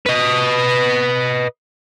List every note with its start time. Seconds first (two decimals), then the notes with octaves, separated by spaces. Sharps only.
0.06 B4 D#5